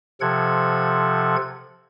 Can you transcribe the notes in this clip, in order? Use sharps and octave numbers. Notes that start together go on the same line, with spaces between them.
C3 F3 A4 F#5 G#6